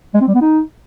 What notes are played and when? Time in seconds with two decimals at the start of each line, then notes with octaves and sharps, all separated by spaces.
0.14 G#3
0.21 C4
0.28 G3
0.35 B3
0.41 D#4